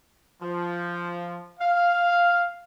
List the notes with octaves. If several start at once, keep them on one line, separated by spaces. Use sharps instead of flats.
F3
F5